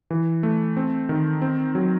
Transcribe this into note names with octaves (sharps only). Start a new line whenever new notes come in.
E3
A3
C4
D#3
C4
F#3